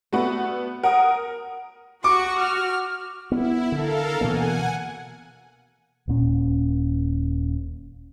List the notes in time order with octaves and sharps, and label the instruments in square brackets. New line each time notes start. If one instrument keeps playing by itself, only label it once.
[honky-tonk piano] A3 B3 [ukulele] F#4 D5 B5
[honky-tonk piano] A#4 D#6 [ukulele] F#5 G#5
[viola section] F#4 [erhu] C#6 [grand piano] D6
[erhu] F6
[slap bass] B3 [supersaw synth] E4
[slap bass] D3 [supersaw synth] A4 A#4 F5
[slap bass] B2 E3 A#3 [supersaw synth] F#5 G#5
[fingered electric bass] D#1 A#2 C#4